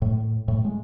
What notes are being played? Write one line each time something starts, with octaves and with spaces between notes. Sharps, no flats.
A2
A2
G#3